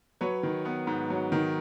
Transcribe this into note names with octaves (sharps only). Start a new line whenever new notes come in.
F#3 B4 C#5
D#3
B3
G#2
F#3
D#3